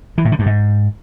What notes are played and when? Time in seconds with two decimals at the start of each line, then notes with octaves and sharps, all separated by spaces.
0.18 E3
0.25 A2
0.32 D3
0.39 G2
0.46 G#2